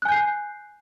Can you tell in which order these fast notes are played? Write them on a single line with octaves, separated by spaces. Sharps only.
F#6 G#5 G6 C7